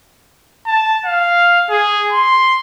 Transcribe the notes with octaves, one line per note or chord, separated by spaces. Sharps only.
A5
F5
G#4
C6